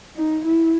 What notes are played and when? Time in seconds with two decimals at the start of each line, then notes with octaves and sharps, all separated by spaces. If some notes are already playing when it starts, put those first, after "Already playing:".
0.16 D#4
0.45 E4